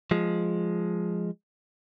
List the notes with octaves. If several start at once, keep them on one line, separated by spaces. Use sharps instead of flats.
F3 G#3